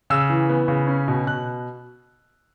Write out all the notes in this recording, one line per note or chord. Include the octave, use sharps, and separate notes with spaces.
C#3 E6
E3
B3
C#3
C#4
B2
B2 F#6